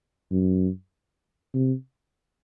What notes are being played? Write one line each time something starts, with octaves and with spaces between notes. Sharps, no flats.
F#2
C3